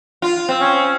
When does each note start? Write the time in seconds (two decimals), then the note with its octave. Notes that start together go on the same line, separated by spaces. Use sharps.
0.22 F4
0.49 C4
0.61 C#4